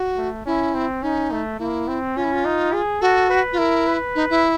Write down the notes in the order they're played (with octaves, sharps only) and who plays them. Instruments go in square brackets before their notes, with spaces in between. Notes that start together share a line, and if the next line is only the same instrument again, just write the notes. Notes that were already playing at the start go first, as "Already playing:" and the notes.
Already playing: [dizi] F#4
[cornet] A3
[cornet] C#4 [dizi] E4
[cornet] C4
[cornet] C#4 [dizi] D#4
[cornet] A3
[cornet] A#3 [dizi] E4
[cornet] C4
[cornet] C#4 [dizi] F4
[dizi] E4
F4
[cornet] D#4
G#4
[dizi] F#4 [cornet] A4
[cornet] B4
[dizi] F4
[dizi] E4 [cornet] A#4
[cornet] B4
[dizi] D#4
E4